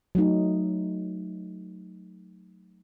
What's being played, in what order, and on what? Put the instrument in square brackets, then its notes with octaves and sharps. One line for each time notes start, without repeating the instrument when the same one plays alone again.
[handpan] F#3 A3 D#4